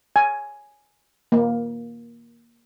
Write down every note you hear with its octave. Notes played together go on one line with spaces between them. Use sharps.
G#5
A#3